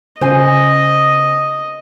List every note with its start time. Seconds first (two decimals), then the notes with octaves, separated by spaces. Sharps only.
0.21 C#3 C5 D#5 G#5